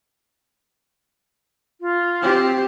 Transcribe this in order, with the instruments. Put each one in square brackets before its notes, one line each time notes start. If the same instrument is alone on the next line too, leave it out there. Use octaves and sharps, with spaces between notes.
[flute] F4
[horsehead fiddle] C4 G4